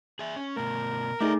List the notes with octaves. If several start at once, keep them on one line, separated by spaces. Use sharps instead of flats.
G#4 E5
C#4
B2 A3 A#4
A3 D#4 G#4 D5 E5